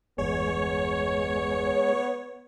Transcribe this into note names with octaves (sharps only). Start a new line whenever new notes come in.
G1 E2 G#3 B3 C#5